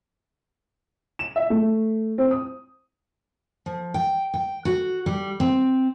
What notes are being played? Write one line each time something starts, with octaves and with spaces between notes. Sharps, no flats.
E7
E5
A3
C4
D#6
F3
G5
G5
F#4
G3
C4